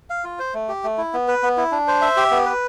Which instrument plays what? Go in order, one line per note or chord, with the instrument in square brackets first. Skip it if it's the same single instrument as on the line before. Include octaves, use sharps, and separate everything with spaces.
[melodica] F5
F4
C5
A3
G4
A3
E4
B3
B4
B3
E4
D4
C5
E5
G4
B3
B4